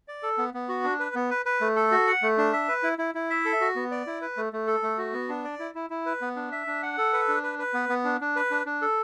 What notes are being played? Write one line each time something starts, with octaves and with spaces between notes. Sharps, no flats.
D5
A4
B3
B3
F#4
D4
B4
B3
B4
B4
A3
A4
F#4
F#5
A3
D4
E5
B4
E4
E4
E4
E5
A4
F#4
B3
D5
E4
B4
A3
A3
A4
A3
F#4
B3
D4
D5
E4
E4
E4
B4
B3
D4
E5
D4
F#5
A4
B4
D4
B4
B4
B3
B3
D4
D4
B4
D4
D4
A4